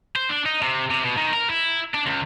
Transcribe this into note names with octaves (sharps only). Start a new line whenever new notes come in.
C5
D4
D#4
C3
C3
B2
D#3
A#4
E4
D4
C#2